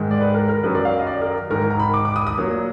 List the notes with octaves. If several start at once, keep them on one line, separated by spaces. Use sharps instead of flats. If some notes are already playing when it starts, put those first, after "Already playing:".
Already playing: G#2 D#3 G#3
D5
B4
A#4
A#4
F#2 D#3 F#3 B4
D5
F5
D#5
D5
A#4
G#2 D#3 G#3 A#4
A#5
B5
D6
D6
D#6
D#6
A#2 F#3 A#3